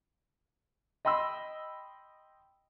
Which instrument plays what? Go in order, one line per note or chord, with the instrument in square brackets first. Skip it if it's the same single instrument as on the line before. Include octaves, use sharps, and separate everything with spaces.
[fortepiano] D#5 G5 B5 C6 E6